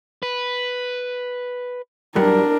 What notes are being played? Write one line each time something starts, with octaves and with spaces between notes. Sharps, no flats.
B4
G2 F#3 G3 D4 A#4